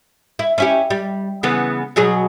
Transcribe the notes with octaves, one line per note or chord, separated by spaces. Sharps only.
E4
C#4 E4 G4
G3
C#3 E3 B3
B2 F#3 G#4